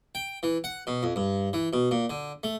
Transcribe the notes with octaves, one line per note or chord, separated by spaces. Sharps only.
G5
E3
F#5
B2
F2
G2
E3
B2
A#2
D3
A3